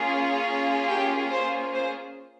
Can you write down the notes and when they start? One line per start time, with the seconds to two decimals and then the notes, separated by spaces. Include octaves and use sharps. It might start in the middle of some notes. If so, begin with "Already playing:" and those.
Already playing: A#3 C#4 F4 G#4
0.88 G4 G5
1.31 C5
1.73 C5